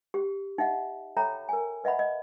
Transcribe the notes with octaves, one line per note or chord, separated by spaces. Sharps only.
G4
D#4 D#5 E5 F#5
A4 C#5 E5 G5 A#5 B5
A#4 G#5
B4 D#5 E5 F#5 B5
D#5